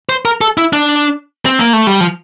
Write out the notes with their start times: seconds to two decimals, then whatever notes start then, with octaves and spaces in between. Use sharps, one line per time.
0.09 C5
0.25 A#4
0.41 A4
0.57 E4
0.73 D4
1.46 C4
1.59 A#3
1.73 A3
1.87 G3
2.00 F3